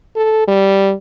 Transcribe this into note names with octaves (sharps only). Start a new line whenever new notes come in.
A4
G3